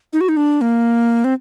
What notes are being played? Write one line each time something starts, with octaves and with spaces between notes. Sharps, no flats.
D#4
F#4
D#4
D4
A#3
C4